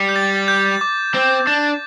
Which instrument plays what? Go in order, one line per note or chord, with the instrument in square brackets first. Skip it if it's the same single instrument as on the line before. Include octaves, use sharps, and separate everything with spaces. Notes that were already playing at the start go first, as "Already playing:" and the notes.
Already playing: [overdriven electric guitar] G3
[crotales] G6
A6
G6
D6
[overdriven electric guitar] C4
[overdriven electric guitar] D4 [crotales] D6